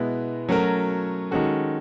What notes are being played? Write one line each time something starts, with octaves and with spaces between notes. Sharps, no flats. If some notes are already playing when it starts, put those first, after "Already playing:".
Already playing: B2 G#3 B3 E4
F#3 A3 C#4 F#4 A#4
D#3 G#3 C#4 F#4 A4